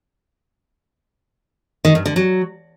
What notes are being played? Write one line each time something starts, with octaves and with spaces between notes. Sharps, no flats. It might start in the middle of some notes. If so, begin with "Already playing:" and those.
D#3
G2
D3
F#3